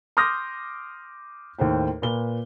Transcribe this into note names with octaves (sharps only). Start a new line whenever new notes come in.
C6 D6 D#6 F6 G6 A#6
D#2 A2 C5 G5
A#2 B4 G7